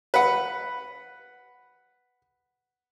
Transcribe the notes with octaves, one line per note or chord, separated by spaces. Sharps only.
B4 F#5